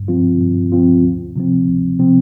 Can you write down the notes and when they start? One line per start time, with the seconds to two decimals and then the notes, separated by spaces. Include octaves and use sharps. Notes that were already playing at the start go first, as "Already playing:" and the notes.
Already playing: G2
0.08 F3 C4 F4
0.41 G2
0.72 F3 C4 F4
1.04 D2
1.36 C3 F3 C4
1.68 D2
1.99 C3 F3 C4